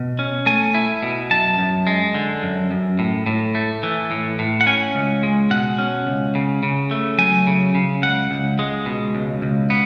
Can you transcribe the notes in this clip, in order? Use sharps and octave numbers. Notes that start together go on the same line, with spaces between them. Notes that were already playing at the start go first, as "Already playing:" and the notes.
Already playing: B2
C#4
A3 G#5
E4
B2
F#2 A5
F#2
G#3
D3
F#2
F#2
A2
A2
A3
E3
A2
A2
F#5
C#4 G#5
C#2
G#3
B2 F#5
C#4
C#2
C#3
C#3
A3
F#3 G#5
C#3
C#3
C#2 F#5
C#2
G#3
B2
C#2
C#2
B3